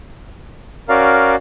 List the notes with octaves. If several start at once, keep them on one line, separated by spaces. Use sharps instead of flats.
C#4 F#4 A#4 D5 F5